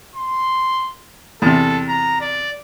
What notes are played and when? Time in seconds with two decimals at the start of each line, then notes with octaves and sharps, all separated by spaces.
0.15 C6
1.42 E2 C3 A4
1.88 A#5
2.21 D5